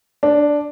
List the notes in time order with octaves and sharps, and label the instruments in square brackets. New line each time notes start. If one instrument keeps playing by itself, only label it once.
[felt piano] D4